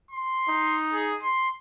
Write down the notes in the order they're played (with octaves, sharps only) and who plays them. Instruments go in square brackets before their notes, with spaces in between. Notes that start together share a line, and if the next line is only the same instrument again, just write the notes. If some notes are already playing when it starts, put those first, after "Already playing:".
[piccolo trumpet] C6
[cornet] D#4
[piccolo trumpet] G#4
C6